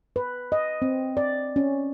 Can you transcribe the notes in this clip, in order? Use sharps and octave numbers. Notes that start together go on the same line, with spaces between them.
B4
D#5
C4
D5
C#4